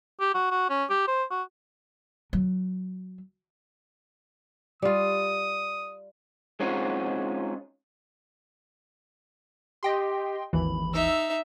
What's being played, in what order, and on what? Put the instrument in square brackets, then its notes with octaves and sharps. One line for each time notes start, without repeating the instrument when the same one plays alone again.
[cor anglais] G4
F#4
F#4
C#4
G4
C5
F#4
[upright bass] F#3
[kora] G3 F4 [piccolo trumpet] D#6
[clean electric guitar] G#3 C4 C#4 D#4 F4 F#4
[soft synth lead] G4 [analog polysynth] D#5 G5 C6
[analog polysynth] G#1 D#2 E3 [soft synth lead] B5
[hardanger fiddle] D#4 E5 [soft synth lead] E6